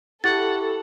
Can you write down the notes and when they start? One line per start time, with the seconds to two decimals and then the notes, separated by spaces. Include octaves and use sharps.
0.24 E4 G4 A4 F#5 C#6 A6